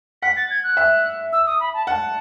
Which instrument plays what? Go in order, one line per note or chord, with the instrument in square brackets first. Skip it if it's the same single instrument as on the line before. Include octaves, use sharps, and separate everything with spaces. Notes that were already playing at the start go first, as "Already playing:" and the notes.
[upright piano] F#5 [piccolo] B6
[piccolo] A6
G#6
F#6
[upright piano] E5
[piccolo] E6
D#6
B5
A5
[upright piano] F#5 [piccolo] A5